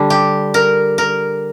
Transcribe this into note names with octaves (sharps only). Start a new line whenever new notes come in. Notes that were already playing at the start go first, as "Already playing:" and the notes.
Already playing: D3 G3 D4
G4
A#4
A#4